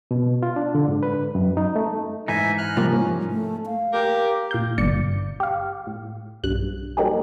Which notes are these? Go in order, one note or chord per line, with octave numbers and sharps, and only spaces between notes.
B2
F4
D4
D3
G#2
B4
F#2
D#4
A3
G#2 E3 D#4 E5 G#5
F6 F#6
C3 F3 G3 A#3
C#4
A3
F5
G4 A#4
A#2 F5 G6
G1 D5 C#7
G4 F5
A2
B1 G2 F#6
F#3 G3 A#3 D#4 G4 G#4